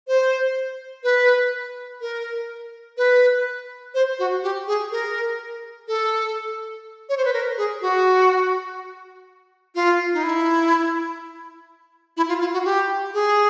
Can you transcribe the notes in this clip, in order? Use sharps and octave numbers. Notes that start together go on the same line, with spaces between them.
C5
B4
A#4
B4
C5
F#4
G4
G#4
A#4
A4
C#5
C5
B4
A#4
G#4
F#4
F4
D#4
E4
E4
F4
F4
F#4
G4
G#4